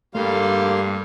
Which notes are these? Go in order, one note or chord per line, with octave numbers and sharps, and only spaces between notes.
G2 D3 G3 A3 A#3 F5 C6